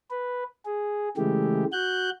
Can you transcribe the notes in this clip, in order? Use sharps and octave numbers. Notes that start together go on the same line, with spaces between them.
B4
G#4
C#3 E3 G#3 A3 G4
F#4 F#6 G6